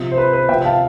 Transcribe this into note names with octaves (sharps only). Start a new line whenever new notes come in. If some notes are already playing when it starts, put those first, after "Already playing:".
Already playing: C3 F3
C5
B4
B4
C3 F3 E5 G5
F5 A5